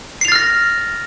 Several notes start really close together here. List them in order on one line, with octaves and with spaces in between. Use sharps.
C7 F7 A6 F6 A#6